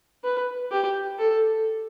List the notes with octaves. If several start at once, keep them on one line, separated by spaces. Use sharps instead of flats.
B4
G4
A4